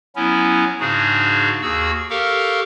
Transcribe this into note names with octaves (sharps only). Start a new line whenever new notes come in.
F#3 B3 C#4 E4
G#2 C#3 D4 D#4 F#4 G#4
D#2 F#4 G#4 E6
G4 A4 A#4 F5 C#6